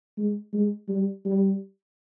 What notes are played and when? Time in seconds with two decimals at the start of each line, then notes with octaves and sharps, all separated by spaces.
0.18 G#3
0.53 G#3
0.89 G3
1.25 G3